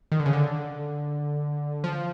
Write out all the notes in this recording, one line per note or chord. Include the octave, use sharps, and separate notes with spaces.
D#3
D3
C#3
D3
F3